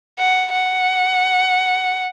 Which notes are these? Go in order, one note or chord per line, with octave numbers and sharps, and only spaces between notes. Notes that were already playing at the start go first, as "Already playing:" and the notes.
F#5
F#5